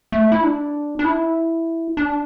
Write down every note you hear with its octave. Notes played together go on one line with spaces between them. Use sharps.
A3
E4
D4
D4
E4
D4